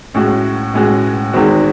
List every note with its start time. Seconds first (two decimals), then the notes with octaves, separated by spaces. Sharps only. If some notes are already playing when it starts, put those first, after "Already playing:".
0.14 A2 G#3 C#4 F#4
0.74 A2 G#3 C#4 F#4
1.33 E2 D#3 G#3 C4 F#4